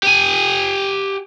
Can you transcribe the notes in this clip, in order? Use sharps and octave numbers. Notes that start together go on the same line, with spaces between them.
G4 G#5